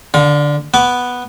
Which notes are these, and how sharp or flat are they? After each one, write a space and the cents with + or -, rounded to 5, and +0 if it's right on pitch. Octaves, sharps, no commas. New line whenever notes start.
D3 +0 F5 +35
B3 +0 F#5 +0 D6 -40